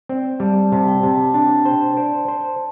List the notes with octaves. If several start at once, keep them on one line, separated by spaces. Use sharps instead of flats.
C4 D5
G3 A5
C3 A5
G5
C3 A5
G5
D4 A5
C5 G5
C5 D5
C5